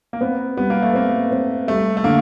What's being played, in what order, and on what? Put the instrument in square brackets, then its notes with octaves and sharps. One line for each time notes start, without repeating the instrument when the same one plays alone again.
[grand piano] A#3
[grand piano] B3 [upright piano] C4
[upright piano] G3 [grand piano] B3
[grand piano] A#3
A3
[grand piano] A#3 [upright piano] C4
[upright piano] C4
[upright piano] G3 [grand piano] A3
[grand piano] A3
[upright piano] D3 [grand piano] A#3